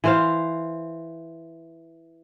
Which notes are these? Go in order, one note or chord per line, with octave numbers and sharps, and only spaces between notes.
E3 C5 F5